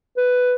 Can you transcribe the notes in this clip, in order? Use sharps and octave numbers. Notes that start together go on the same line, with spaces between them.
B4